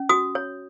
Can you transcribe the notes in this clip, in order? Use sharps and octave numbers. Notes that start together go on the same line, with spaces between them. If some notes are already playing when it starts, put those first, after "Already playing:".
Already playing: C#4
F#4 D#6
C#5